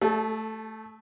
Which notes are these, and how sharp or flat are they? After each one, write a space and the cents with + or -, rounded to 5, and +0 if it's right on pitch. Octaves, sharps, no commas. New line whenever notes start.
A3 +0 A4 -30